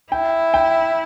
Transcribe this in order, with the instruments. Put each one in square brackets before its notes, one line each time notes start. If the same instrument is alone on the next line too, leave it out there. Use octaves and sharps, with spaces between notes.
[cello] E4 [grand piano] G5
[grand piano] G5